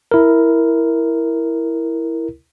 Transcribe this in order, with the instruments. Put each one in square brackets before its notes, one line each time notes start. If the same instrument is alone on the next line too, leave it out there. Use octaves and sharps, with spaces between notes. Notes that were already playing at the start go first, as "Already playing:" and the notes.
[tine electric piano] E4 A#4